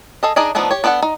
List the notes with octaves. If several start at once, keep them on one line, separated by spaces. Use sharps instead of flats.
G#4 A4 D#5
D4 D#4 G#4 D5 D#5
F3 A3 B3 D4 D#4
G4 C#5
B3 D4 A4 C#5 F#5
D#4